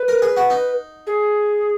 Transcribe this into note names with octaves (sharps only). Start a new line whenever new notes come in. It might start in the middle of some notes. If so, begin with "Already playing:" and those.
Already playing: B4
A#4
G#4
F#4
D#4
G#4